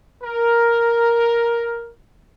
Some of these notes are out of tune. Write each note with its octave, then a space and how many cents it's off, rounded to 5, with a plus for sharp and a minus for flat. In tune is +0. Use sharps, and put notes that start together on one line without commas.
A#4 +5